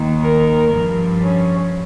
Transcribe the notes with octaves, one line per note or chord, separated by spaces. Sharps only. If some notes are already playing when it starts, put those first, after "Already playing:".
Already playing: D#2 D#3
A#4
G2 F3
C#4